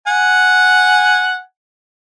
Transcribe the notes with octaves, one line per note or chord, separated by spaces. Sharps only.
F#5 G#5